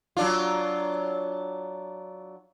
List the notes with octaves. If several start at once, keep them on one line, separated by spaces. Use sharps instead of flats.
F#3 D4 F4